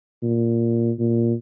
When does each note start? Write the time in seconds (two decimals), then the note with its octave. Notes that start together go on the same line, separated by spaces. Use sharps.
0.23 A#2
0.99 A#2